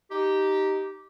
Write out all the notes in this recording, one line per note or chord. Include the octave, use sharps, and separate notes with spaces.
D#4 G4